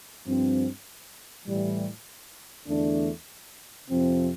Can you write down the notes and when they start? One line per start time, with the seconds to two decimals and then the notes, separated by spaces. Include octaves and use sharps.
0.25 G2 F3 C4
1.45 A2 E3 G3
2.67 E2 D3 A3 D4
3.88 F2 C3 F3 C4